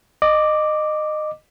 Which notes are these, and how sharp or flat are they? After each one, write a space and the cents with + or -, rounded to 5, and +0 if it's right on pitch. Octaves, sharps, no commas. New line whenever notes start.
D#5 -20 D6 +0